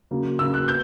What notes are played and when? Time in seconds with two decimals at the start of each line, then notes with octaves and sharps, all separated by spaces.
0.11 C#3 F#3 A#3
0.39 C#3 F#3 A#3 E6
0.54 F#6
0.68 B3 G6